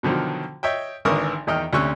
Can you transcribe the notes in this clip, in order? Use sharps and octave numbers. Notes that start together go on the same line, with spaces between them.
B2 D3 D#3 F3 F#3
C#5 D#5 E5 G5
G#1 D3 E3 A#4 C#6 D#6
E2 D#3 D#5 G5 F6
D2 C3 C#4 C#6 E6 F#6